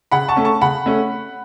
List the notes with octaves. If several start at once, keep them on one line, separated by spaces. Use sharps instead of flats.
C#3 F#5 B5
A5 C#6
A3 C#4
A5 C#6
C#3 F#5 B5
A3 C#4